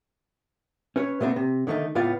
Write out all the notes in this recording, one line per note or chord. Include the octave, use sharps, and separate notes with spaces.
C#4 B4 C#5
A#2 A3 B3 C4 D4
C3
D3 D#3 A3 D4 D#4
C#2 A2 B3 F4 D5 F5